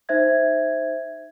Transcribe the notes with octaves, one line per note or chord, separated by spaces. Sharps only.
D#4 C5 E5 G#6